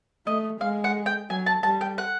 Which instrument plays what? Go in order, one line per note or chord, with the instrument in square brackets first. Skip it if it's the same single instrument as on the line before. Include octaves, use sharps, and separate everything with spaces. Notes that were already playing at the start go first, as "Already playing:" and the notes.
[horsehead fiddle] A3 [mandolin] D#5
[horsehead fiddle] G#3 [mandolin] F5
[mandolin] F#5
G5
[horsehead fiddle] F#3 [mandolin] G#5
[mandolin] A5
[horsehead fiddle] G3 [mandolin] A5
[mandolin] G5
F#5